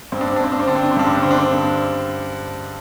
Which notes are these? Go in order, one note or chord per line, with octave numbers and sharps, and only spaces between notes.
G2 C4
D4
C4
D4
G2 C4
D4
C4
D3 D4
C4
D4
C4
G2 D4
C4
D4
D3 C4
D4
C4
G2